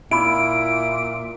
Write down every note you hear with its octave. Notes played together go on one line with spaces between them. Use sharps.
A#2 D#4 E4 B5 D7